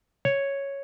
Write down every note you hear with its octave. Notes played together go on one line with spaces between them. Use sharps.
C#5